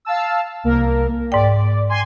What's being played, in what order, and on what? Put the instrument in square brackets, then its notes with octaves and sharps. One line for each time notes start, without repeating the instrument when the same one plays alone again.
[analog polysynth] F5 A5 E6
C2 A#3 A#4
[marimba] G#2 G5 [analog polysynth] D5
[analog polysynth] G#5 C6